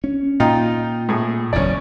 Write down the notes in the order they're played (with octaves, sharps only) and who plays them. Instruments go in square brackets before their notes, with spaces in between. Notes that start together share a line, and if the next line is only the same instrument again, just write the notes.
[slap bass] C#4
[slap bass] A#2 [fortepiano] D#4 F4 G5
[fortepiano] A2 G#4
[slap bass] F#1 E2 [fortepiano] C#4 D5